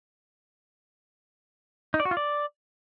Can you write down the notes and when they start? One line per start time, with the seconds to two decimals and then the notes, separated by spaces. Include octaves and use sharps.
1.94 D#4
2.00 D5
2.05 F#4
2.11 F4
2.17 D5